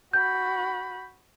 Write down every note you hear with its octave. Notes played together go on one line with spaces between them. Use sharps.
F#4 B5 G6